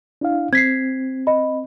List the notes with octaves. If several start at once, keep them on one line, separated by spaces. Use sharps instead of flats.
D4 E4 F5
C4 G#6 B6 C7
D#5 B5